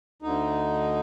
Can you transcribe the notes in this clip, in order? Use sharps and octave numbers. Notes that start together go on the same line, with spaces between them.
D2 D3 D#4